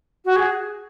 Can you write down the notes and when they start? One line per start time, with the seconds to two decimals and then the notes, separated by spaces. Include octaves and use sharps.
0.25 F#4
0.36 G#4